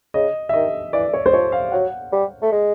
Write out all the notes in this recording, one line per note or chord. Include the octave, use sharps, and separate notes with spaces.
C#3 D#5
E5
D#3 D#5
E3 D5
C#5
C5
F3 C#5
F5
F#3 F#5
G3
A3
G#3